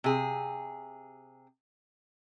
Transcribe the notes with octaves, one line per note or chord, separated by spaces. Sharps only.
C3 G#4